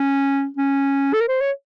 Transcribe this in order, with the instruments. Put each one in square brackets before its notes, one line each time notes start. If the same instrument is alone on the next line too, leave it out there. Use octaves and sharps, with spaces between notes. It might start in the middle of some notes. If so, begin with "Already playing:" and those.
Already playing: [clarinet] C#4
C#4
A4
A#4
C5
C#5